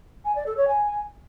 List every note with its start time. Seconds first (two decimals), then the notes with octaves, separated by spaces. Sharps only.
0.24 G#5
0.35 D5
0.46 A4
0.56 C#5
0.67 G#5